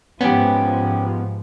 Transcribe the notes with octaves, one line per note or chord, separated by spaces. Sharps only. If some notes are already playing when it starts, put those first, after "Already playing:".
G#2 F3 B3 C#4 G4